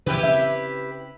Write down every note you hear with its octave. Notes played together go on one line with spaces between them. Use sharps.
C#3 E3 E4 G4 B4
C#3 C4 E5